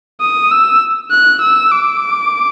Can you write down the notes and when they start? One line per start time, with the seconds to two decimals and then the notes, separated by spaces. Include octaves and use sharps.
0.21 D#6
0.52 E6
1.11 F#6
1.42 E6
1.72 D6